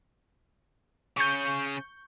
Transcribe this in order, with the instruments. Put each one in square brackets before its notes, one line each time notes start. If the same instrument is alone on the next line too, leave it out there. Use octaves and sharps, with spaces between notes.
[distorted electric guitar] C#3 C#4 [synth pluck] C#6 G6